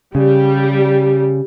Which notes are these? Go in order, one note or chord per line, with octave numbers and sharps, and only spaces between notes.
C#3 G3